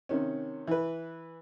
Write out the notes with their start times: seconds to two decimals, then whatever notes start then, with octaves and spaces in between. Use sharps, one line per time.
0.09 C3 D#3 C#4
0.68 E3 B4